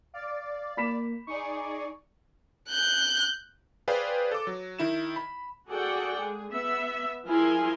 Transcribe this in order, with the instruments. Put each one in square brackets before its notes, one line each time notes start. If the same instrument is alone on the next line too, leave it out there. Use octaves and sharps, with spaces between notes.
[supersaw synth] D5 [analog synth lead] F5
[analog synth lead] A#3 [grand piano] B5 B6 E7
[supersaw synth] D#4 G#4 D5 [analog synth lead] C#6
[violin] F#6 G6
[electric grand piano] G#4 B4 C5 D5 F5 G5
A4 D6
F#3
D#3 E4 E7
B5
[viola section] F#4 G#4 A4 D5 F#5 G5
G#3 G#4
B3 E5
F3 E4 G#4 A#4 G#5 C6